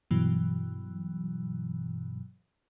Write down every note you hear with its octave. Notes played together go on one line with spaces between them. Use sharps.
G2 B2 E3 F#3